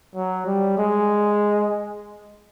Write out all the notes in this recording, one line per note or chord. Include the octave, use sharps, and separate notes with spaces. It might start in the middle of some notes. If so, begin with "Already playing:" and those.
F#3
G3
G#3